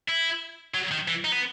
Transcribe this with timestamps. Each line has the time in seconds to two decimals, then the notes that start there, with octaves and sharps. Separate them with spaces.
0.08 E4
0.74 F#3
0.91 D#3
1.08 E3
1.24 D#4
1.32 B3